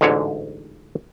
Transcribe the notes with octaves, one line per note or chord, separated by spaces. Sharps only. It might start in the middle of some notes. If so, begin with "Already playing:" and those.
A1 D2 G#2 D3 C#5